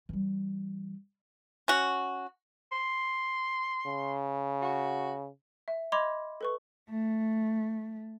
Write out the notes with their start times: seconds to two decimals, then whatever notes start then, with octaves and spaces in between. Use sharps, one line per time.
0.09 E3 G3
1.68 C#4 F#4
2.72 C6
3.86 C#3
4.62 F#4
5.68 E5
5.92 D#5 B5 C6 D6 G#6 F7
6.41 A4 B4 C#6
6.89 A3